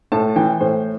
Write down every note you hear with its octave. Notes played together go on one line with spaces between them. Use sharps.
A2 A5
E3 G5
A2 C5